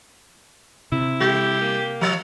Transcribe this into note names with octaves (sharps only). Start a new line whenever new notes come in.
C3 E4
G3 G4
A#3
F3 C#5